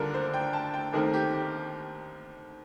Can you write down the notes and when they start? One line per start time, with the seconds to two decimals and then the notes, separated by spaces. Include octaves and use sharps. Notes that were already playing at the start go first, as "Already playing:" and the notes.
Already playing: D#2 D3 G3 D4 F4 A4 A#4
0.14 C5
0.34 G5
0.53 A5
0.74 G5
0.93 D#2 D#3 A3 C4 A#4
1.13 G4
1.33 G4